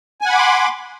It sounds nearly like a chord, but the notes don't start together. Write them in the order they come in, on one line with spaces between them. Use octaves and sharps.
G#5 F#5 B5 D6 C6